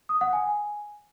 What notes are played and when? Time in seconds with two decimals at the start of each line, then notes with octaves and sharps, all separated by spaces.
0.09 D#6
0.21 F#5
0.33 G#5